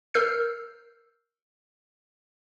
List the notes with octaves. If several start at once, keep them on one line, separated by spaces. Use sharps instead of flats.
A#4 E6 F6 G6 C7